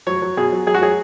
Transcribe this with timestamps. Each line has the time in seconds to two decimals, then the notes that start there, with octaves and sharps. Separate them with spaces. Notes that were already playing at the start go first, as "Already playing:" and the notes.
0.07 F#3 C#5
0.22 F#3
0.37 B2 G#4
0.52 F#3
0.66 F#3 G#4
0.74 F#4
0.81 F#3 G#4